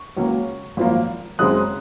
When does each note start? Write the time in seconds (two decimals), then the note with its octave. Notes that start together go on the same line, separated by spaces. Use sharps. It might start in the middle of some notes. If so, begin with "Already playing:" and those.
Already playing: C#6
0.17 C#2 C#3 F#3 A#3
0.77 G#1 F#2 F3 A#3
1.39 F#1 F#2 C#3 G#3 C4 D#6 F#6